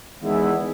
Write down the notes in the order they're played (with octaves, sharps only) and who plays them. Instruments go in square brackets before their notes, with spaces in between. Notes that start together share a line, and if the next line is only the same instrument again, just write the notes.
[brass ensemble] E2 D#3 G#3 B3 E4